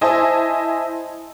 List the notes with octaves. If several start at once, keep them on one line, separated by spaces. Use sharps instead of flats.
E4 C5 D#5 G#5 A5